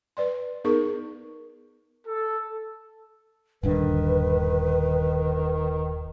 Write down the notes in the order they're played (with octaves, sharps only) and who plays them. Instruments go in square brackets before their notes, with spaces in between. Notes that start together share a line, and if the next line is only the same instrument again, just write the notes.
[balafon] B4 D5 C6
B3 D#4 G#4 A#4 C#6
[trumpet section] A4
[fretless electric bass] D#1 G2 D3 [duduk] D#3 [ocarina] B4